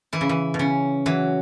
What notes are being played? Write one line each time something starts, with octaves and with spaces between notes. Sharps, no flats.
E3 E4
C#3
E3
B2
C#3 C#4
E3 F#3